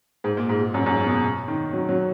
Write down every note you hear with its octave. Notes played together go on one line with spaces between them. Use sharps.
G#2
A#2
G#2
G#2
F#2
F#2
G#2
B2
D#3
F#3
F#3